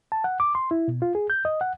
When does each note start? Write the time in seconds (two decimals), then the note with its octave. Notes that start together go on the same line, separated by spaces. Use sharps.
0.12 A5
0.24 F#5
0.40 D6
0.55 C6
0.71 E4
0.88 B2
1.02 F4
1.15 G#4
1.30 G6
1.45 D#5
1.61 F#5